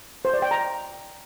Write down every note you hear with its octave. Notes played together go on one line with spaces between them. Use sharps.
C5
D5
G5
A#5